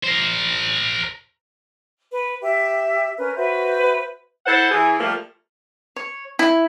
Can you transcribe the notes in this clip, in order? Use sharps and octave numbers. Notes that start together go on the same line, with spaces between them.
A#4 C5
B4
G4 E5
C#4 A#4 B4
F#4 B4 C5 E5
E4 A4 C5 F#5
E3 G#4
F3 G3 A3 A#3
C#5
E4